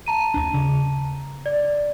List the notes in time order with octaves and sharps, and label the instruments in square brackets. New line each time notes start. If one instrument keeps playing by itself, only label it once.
[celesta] A5 A#5 D#7
[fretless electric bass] D#2 D4
C#3
[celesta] D5